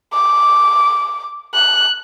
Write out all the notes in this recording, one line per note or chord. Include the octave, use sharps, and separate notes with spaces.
D6
F#6